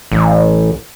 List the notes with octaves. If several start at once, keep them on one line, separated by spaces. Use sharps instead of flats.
A1